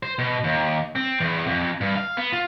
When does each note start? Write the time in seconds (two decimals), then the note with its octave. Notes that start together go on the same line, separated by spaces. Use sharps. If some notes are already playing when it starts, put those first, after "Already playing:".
0.03 C5
0.19 B2
0.44 D#2
0.95 C4
1.20 E2
1.46 F2
1.81 G2
1.96 F5
2.17 B3
2.33 F4